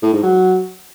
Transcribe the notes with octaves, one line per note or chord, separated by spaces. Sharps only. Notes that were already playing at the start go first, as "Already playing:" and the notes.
A2
G#2
F#3